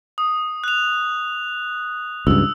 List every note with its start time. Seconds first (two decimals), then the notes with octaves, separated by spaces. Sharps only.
0.18 D#6
0.64 F#6 F7
2.27 C#2 G2 E6